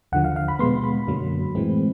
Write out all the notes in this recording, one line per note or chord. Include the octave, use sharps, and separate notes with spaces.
D#2 D3 F3 F#5
F5
F5
B5
B2 G#3 B3 C6
B5
F#2 D3 F#3 A#3
A2 E3 G#3 C4